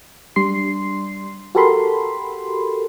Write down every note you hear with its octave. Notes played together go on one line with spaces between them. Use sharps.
G3 D4 C6 C7
F#4 G4 A4 A#4 B5 C6